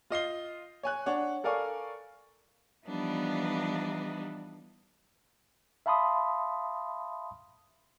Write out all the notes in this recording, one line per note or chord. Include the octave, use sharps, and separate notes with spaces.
F4 D#5 C7 G7
C#5 G#5 F#6
D4 C#5 F#5
A4 A#4 D5 F5 G#5 C#6
E3 F3 G3 B3 D4 D#4
E5 F5 A5 B5 C6 D#6